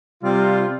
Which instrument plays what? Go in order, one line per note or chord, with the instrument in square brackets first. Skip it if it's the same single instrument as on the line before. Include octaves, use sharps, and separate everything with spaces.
[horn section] C3 G3 F4